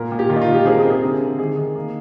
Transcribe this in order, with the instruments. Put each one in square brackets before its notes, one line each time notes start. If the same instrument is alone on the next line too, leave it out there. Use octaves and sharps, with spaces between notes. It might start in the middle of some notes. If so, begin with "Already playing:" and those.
Already playing: [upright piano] A#2 A#4
A#2
G4
D#3 F4
D#4
F4
D#3
G4
C4 G#4
A#4
G#4
C3
G#4
D3
D3
D#3 G#4
D#3
A#3